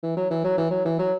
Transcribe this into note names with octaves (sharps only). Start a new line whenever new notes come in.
E3
F#3
E3
F#3
E3
F#3
E3
F#3